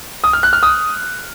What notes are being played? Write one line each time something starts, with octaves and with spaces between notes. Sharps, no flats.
D#6
F6
F#6
F6
D#6